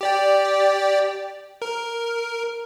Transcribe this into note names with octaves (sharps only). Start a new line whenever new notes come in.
G4 D5 G5
A#4